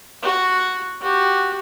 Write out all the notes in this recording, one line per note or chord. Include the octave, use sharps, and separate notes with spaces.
F#4
F#4 G4